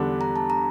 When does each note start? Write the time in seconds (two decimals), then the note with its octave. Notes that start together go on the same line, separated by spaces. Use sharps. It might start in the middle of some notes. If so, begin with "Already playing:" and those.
Already playing: E2 D3 G3 D4
0.21 A#5
0.36 A5
0.50 A#5